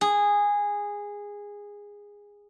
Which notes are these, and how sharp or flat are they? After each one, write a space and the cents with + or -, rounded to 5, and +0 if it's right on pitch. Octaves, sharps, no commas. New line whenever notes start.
G#4 -15